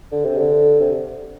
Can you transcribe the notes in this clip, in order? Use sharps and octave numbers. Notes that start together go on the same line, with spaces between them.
D3
C3
D3
C3